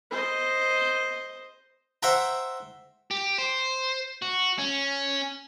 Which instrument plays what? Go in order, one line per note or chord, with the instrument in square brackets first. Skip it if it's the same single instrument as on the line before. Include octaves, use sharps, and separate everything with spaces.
[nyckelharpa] C5 D#5
[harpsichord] C5 E5 F#5 G5 A#5
[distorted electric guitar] G4
C5
F#4
C#4